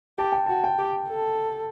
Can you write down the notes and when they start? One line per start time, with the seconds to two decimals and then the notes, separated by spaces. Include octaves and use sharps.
0.18 G4 A5
0.32 G5
0.46 A5
0.49 F#4
0.64 G5
0.78 G4
1.08 A4